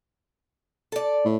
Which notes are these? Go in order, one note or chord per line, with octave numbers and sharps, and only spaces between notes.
A4 D5
A2